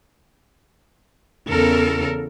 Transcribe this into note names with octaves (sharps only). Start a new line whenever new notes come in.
E2 C#3 A4 A#4